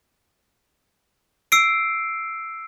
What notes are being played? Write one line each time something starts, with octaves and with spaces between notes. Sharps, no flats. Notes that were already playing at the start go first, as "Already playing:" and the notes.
E6 C7 D7